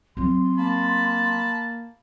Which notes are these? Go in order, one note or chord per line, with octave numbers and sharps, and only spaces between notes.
F#3 C4 C6
A#3 A5 B5